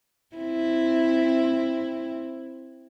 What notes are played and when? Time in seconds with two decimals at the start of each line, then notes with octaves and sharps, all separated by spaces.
0.36 C4 E4